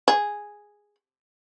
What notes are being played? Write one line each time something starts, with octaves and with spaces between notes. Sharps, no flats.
G#4